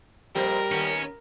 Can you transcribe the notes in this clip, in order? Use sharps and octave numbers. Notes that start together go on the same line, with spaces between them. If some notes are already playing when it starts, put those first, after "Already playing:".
F2 A#2 G3 A#4 C5
D#2 B3 C#4